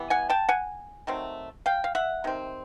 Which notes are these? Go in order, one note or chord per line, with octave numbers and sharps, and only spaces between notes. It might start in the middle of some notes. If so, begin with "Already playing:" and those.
Already playing: E3 G3 B3
F#5 G#5
G5 A5
F#5 G#5
D#3 F#3 A3 C4
F5 G5
F5
E5 F#5
C3 D#3 C4